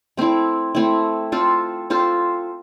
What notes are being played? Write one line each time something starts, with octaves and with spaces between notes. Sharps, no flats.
A3 C4 E4
A3 C4 E4
C4 F4 A4 C5
C4 F4 A4 C5